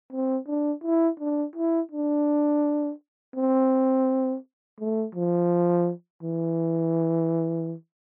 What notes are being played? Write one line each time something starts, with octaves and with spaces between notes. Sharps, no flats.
C4
D4
E4
D4
E4
D4
C4
A3
F3
E3